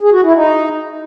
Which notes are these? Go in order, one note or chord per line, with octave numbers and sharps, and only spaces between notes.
G#4
F#4
E4
D#4